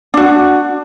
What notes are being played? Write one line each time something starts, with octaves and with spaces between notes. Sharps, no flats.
D4 F#4